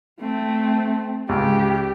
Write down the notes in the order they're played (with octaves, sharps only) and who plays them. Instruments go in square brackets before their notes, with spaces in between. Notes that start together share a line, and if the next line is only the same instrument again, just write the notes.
[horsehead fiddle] A3 C4
[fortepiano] C#2 [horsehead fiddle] G4